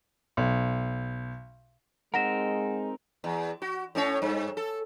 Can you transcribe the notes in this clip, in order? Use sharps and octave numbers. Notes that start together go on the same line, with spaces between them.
B1
G#3 C4 D#4 A#4 F#5 A#6 E7
E2
F#4
A2 C#4 C#5
G2
A4